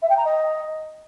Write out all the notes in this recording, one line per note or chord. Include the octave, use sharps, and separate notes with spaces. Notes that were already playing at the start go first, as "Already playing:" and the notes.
E5
G5
A#5
D#5